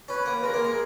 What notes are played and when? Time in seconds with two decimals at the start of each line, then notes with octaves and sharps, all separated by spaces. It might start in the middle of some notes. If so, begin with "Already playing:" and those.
0.08 C#4 B4
0.26 A#3
0.43 G#3 A#4
0.54 A#3
0.64 G#3